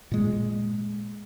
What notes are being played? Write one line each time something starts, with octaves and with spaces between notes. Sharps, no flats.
A#2 G#3